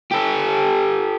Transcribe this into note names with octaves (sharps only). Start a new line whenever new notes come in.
G4 A4